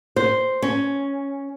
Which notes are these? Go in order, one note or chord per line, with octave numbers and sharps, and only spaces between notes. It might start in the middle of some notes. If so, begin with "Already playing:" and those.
C5
C#4